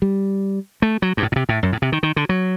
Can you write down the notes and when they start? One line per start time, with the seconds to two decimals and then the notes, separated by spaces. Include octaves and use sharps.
0.02 G3
0.82 A3
1.02 F#3
1.17 G2
1.23 A2
1.32 A#2
1.36 C3
1.49 A2
1.63 F#2
1.72 A2
1.82 C3
1.92 D#3
2.03 D#3
2.16 D3
2.29 F#3